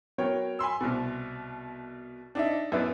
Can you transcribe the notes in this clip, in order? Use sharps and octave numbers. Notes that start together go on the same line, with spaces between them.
F#3 B3 A#4 C#5 G5
G#5 B5 C6 E6
C2 B2
D4 D#4 E5
F#2 B3 E4 B4 D5 D#6